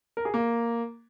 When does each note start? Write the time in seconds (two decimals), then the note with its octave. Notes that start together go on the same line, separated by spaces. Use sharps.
0.17 A#4
0.25 G#4
0.34 A#3